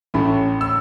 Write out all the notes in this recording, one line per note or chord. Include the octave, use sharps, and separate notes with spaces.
A1 A2 A3 C#4 B5
E6